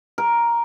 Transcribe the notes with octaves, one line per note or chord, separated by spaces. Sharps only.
A#4